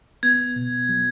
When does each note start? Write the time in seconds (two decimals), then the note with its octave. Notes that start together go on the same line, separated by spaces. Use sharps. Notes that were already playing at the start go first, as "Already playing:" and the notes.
0.23 B3 G#6
0.56 B2
0.89 F#3